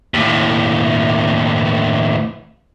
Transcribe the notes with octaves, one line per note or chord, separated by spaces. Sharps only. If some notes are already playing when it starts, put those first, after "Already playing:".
D#2 A2